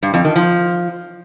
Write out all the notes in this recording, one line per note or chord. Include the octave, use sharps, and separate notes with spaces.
G2
F2
D#3
F3